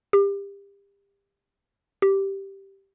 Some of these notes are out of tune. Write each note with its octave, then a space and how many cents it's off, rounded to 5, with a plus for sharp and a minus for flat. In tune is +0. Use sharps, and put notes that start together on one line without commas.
G4 +30
G4 -5